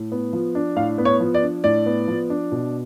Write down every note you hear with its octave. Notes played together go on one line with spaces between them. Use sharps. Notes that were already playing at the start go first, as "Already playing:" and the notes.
Already playing: A2
B3
F3
D4
A2 F5
B3
C#5
F3
D5
D4
A2 D5
B3
F3
D4
B2